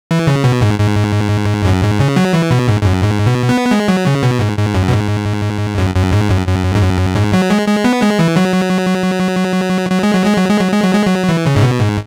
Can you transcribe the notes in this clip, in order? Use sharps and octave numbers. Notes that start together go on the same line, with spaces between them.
E3
C#3
B2
G#2
G#2
F#2
G#2
C#3
F#3
E3
B2
G#2
G#2
F#2
G#2
B2
B3
G#3
F#3
C#3
B2
G#2
G#2
F#2
B2
G#2
F#2
F#2
G#2
F#2
F#2
G#2
F#2
G#2
F#3
G#3
G#3
B3
G#3
E3
F#3
F#3
G#3
F#3
G#3
F#3
G#3
F#3
G#3
F#3
G#3
F#3
E3
C#3
G#2
B2
G#2